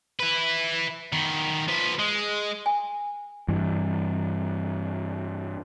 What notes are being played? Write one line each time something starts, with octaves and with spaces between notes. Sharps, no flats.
E4 B4
D#3 B3
F3 B4
G#3
G#5
G2 E3